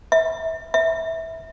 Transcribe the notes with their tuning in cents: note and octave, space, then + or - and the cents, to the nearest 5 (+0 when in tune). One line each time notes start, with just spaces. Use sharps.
E5 -25
E5 -15